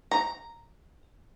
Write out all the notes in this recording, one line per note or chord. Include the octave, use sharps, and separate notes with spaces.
A#5